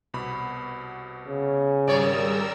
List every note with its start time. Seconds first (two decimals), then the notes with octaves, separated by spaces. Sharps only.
0.14 C2 B2 B5
1.28 C#3
1.87 G#1 G3 G#4 A#4 C#5 D5 E6